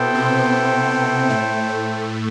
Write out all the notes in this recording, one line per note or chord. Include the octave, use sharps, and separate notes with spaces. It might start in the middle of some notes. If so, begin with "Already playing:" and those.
Already playing: B2 B3 E4 A4 C5 G5
C3 C4
B2 B3
A2 A3
A2 A3